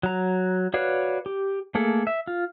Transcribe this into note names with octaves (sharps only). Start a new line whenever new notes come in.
F#3 A#5
F#4 B4 C#5 D5 F5
G4
A3 A#3 G#4 A4
E5
F4